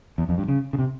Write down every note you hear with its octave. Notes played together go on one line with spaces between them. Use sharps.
E2
F2
G2
C#3
C#3
C3